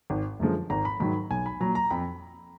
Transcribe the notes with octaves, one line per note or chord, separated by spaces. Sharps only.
G#1
F#2 D3 F3 G#3
G#1 A#5
B5
G#2 D#3 F#3 B5
B1 G#5
B5
A#2 F#3 A#5
A#5
F2 B5